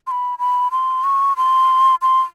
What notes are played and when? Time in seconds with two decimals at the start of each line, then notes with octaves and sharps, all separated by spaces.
0.07 C6
0.11 B5
0.39 B5
0.71 C6
1.04 C#6
1.37 C6
2.02 C6